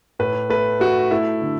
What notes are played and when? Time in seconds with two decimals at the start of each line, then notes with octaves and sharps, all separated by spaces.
0.19 A2 B4
0.50 A3 B4
0.80 A3 F#4
1.11 A3 E4
1.41 D3